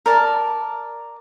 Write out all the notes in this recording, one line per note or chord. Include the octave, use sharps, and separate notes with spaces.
A#4 D5 A5